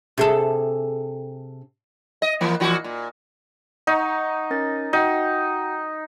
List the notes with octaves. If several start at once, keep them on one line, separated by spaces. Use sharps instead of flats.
C3 G#4 A4
D#5
E3 A#3
A#2 E3 F#4
A#2
D#4 F#5 A#5 C#6
C#4 A#4 A6
D#4 F#4 F#5 G5